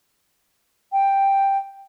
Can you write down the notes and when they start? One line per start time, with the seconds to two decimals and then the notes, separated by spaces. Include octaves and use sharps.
0.92 G5